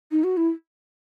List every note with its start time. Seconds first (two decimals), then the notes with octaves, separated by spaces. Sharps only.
0.11 D#4
0.24 F#4
0.37 E4